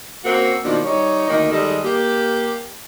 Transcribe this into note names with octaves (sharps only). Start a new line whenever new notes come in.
A#3 C4 C#4 F#4 A#4
B2 D#3 F3 A#3 D4
G3 D#4 C#5
D2 D#3 A#3 D#5
D#3 G3 G#3 A4 D#5
A#3 G4